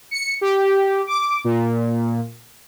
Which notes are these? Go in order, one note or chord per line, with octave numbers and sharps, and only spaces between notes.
C#7
G4
D6
A#2